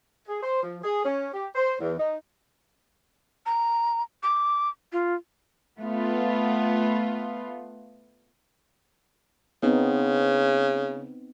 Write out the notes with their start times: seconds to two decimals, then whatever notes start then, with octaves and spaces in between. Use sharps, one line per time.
0.28 G#4
0.43 C5
0.63 F3
0.83 G#4
1.05 C#4
1.34 G4
1.56 C5
1.80 E2
1.99 D#4
3.46 A#5
4.23 D6
4.92 F4
5.79 A3 B3 F4
9.63 C#3 B3 C4 D#4